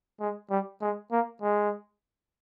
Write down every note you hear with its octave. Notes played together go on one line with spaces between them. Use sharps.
G#3
G3
G#3
A#3
G#3